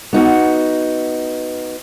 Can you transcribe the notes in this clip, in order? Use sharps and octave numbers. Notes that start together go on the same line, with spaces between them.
B3 D#4 F#4